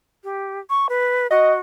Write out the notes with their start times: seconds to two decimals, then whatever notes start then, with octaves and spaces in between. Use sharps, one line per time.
0.24 G4
0.70 C#6
0.89 B4
1.31 F#4 D#5